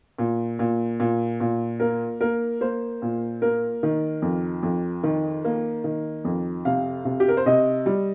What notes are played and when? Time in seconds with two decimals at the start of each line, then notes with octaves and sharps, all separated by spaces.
0.18 A#2
0.59 A#2
1.00 A#2
1.40 A#2
1.80 A#3 A#4
2.21 A#3 A#4
2.61 A#3 C5
3.02 A#2
3.42 A#3 A#4
3.83 D#3
4.22 F2
4.63 F2
5.03 D#3
5.45 A#3
5.84 D#3
6.25 F2
6.65 C3 F5
7.05 C3
7.20 G4
7.28 A#4
7.37 C5
7.46 C3 D#5
7.86 G3